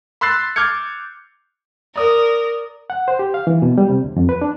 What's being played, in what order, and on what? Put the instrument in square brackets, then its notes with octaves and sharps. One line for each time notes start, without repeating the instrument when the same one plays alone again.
[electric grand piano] B5 C6 E6 F#6 A6 C7
D6 F6 G6 G#6 C#7
[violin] A#4 [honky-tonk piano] D5 D#6
[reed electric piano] F#5
C5
G4
F5
E3
B2
G3
C3
D2
F2
B4
D4